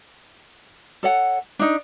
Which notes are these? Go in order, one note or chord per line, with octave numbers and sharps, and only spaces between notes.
A4 C#5 F#5
D4 D#4